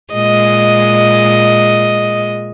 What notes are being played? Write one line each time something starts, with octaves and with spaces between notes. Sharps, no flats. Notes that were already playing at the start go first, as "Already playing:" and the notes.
A#2 G#3 D#5